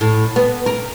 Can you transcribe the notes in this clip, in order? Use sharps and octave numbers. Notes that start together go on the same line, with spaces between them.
A2
B3
A#4